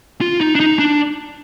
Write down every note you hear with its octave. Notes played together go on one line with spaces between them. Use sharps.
F4
D#4
D4
D#4
D4